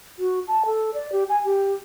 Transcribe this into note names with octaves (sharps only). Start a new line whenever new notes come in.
F#4
A5
A4
D5
G4
G#5
G4